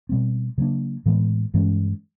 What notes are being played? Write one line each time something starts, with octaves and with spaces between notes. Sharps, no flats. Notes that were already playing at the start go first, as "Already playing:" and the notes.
B2 G3 C4
C#3 F#3 A#3 D4
A2 E3 G#3 B3
G2 E3 G#3 C#4